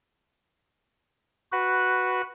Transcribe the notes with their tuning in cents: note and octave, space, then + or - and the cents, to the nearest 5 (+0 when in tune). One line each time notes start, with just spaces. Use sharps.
F#4 +0 B4 +0